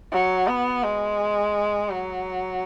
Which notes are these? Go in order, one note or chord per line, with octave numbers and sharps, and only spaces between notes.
F#3
B3
G#3
F#3